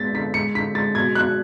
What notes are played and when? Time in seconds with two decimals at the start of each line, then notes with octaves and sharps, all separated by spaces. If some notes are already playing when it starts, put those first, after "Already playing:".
Already playing: G#3 B3 A6 B6
0.14 D3 B6
0.34 G#3 C#7
0.55 D3 B6
0.75 G#3 A6
0.95 B2 G#6
1.15 B2 F#6